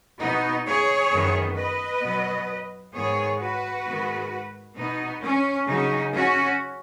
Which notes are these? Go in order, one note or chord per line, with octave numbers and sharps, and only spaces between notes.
B2 B3 D#4
G#4 C#5
F#2 D#3 B3
B4 D#5
B2 F#3 B3
G#2 D#3 B3 G#4 C#5
F#4 B4
G#2 D#3 G#3 B3
B2 B3 D#4
C#4
C#3 F#3 C#4 D#4
C#4 F#4